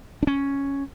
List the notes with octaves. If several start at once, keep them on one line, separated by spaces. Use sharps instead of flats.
D4
C#4